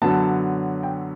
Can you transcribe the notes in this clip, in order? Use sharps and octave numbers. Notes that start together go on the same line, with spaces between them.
F#2 D3 F#3 B3 A5
G5